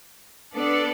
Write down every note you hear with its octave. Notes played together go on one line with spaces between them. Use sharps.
B3 D4 A4 D5